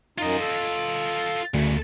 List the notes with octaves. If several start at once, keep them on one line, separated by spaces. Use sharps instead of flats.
F#2 D#4 F4 D#5
A4
D2 C#3 A3